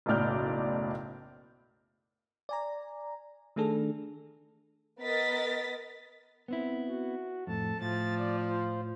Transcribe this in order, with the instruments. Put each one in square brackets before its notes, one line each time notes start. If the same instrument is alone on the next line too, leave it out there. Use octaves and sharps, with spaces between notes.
[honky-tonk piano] F#1 B1 A2 D5 F6 G6
[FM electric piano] D5 G#5 A#5
D#3 A3 D4 G#4 A4
[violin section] B3 A#4 D#5 A6 B6
[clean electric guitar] B3 C4 E4
[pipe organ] F#4
[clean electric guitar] F2 A2 [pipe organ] A4 A5
[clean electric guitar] A2 [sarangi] F3 [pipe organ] A6
[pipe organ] D5
F4 C5